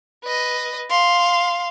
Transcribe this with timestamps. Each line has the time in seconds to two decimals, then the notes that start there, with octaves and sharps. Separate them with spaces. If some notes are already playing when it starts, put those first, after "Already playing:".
0.24 B4 D#5
0.91 F5 C6